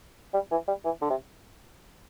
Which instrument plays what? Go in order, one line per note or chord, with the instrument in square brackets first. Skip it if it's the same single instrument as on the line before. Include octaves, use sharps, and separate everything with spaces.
[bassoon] G3
E3
G3
E3
D3
C3